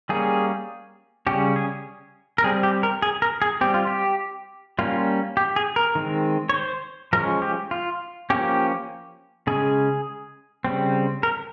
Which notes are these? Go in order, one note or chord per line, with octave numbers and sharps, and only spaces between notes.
G3 A#3 C#4 G#4
C#3 G3 C#4 G4
G#4
A#4
G3 C4 G#4
G4
A#4
G#4
A#4
G#4
G3 C4 G4
F4
G4
G3 A#3 C#4 F4
G4
G#4
A#4
D#3 G#3 C4
C#5
C5
F3 G#3 C#4 A#4
G4
F4
F3 A#3 C#4 G4
C#3 G#3 C#4 G#4
C#3 G3 C4
A#4